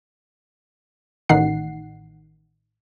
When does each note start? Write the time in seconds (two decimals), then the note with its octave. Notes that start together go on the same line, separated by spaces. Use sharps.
1.29 A1 D#3 D#4 F#5 C7